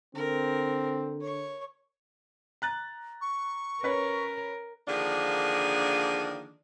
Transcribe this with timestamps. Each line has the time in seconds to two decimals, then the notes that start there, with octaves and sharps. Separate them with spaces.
0.15 D3 C4 A#4
1.21 C#5 C#6
2.62 A#5 F#6 A6
3.21 C#6
3.83 C#4 A#4 B4 C#5
4.87 D3 D#3 F3 A#3 D4 G#4